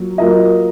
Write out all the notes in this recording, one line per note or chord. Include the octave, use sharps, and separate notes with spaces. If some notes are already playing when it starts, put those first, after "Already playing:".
Already playing: F#3 A#3 F4
F#3 A#3 F4 A#4 D#5